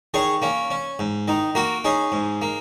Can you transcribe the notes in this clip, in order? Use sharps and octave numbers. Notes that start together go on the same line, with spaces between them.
D#3 G#4 C#5
A#3 C#4
C#4
G#2
D#3 D#4
A#3 F#4 A#4
C#4 D#4 G#4
G#2
A#3